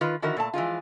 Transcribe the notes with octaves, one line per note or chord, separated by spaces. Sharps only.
D#3 F4 B4
D3 D#3 F3 E4 F#4 A#4
A#2 A3 A5
E3 F3 G#3 F4